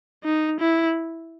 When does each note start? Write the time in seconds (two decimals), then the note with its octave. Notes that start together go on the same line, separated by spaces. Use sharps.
0.24 D#4
0.60 E4